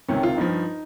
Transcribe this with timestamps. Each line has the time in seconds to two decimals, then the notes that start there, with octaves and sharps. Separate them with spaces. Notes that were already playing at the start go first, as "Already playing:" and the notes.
0.08 C#2 C3 D#3 C#4
0.23 F4
0.37 G2 F3 D#4